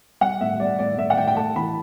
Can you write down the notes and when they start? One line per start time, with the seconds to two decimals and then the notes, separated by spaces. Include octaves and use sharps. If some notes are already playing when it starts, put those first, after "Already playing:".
0.21 G3 F#5
0.41 A2 E5
0.60 G3 D5
0.79 A2 D5
0.98 A2 E5
1.10 F#5
1.17 A2 G5
1.27 G5
1.36 A3 A5
1.55 E3 B5